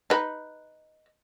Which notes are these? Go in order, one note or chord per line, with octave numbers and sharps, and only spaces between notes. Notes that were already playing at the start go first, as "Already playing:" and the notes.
D#4 B4